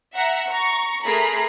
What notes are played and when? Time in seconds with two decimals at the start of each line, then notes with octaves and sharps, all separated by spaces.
0.15 E5 F#5 A#5
0.49 A#5 C#6
1.06 A3 G#4 A#4 A#5 B5 C7